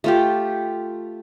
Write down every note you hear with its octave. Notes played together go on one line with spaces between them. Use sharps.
A3 F4 G4